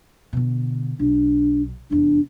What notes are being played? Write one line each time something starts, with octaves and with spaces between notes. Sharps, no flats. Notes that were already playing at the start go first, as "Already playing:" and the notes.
B2 D3
B1 D4
F1 E2 D4